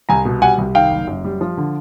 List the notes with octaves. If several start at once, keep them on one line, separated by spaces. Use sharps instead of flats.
C2 G#5 A#5
B2
G3 F#5 G#5
C2
D#3 F5 G5
F#1
F#2
G3
F3
D3